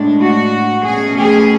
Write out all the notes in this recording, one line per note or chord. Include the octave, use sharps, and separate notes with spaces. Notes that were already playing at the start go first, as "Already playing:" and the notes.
Already playing: A2 G#3 D4
F#4
B2 A3 C#4 G#4
G#4